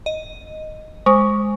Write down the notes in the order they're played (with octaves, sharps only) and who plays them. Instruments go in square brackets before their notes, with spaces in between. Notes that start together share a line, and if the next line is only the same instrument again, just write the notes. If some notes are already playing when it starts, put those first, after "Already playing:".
[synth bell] D#5
[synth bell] G#3 [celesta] C5 C#6